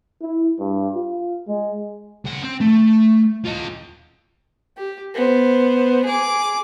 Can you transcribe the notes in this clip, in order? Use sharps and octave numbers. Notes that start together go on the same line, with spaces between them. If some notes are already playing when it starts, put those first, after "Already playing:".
E4
G2
F4
G#3
C#3 F#5
C4
A3
F4 D#5
G4
B3 C5
G#4 D6